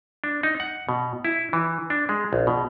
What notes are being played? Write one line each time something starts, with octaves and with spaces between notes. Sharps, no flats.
D4
D#4
F#5
B2
E4
E3
D4
G#3
A#1
B2